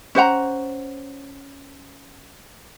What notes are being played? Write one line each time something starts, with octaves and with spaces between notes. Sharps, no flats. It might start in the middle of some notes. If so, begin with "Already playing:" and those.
C#4 C5 F#5 A#5